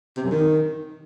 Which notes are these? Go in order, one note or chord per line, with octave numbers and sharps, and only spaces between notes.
C3
F#2
D#3